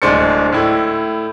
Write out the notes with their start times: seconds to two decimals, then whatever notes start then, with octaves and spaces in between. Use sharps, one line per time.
0.02 D1 G#3 D4 C5 A6 C#7
0.52 A2 E4